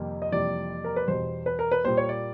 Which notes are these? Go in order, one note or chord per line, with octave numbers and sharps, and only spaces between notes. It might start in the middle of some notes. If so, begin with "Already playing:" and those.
Already playing: F2 C3 D#3 G3 A#3
D#5
F2 C3 E3 G3 A#3 D5
A#4
B4
E2 B2 G3 C5
B4
A#4
B4
A#2 G3 A#3 C5
C#5
D5